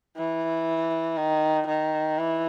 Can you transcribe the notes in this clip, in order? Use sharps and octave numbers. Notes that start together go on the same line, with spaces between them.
E3
D#3
D#3
E3